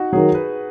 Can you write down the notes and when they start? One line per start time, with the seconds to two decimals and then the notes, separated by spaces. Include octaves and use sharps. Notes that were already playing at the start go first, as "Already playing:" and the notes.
Already playing: D#4 F#4
0.13 F#3 G#4
0.17 D#3
0.34 B4